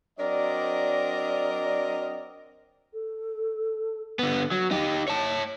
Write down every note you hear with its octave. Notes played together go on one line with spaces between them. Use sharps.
F#3 C4 D4 A#4 D5 D#5
A4
D3 B3
F#3
D#4 G4
C#5 A5